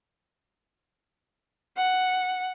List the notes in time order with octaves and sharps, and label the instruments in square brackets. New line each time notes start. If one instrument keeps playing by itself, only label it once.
[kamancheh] F#5